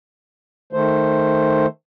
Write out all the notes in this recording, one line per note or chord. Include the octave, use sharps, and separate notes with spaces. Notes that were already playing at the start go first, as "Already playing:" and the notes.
D#3 A3 C5